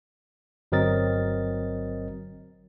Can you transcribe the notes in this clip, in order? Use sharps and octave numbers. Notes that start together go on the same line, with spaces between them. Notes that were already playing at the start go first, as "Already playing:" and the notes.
G1 F#3 C4 A#4 D#5 A6